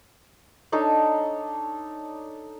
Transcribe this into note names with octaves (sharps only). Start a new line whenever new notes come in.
D4 D#4 A4 C#5